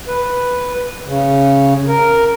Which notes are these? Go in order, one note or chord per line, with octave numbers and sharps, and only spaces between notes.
B4
C#3
A#4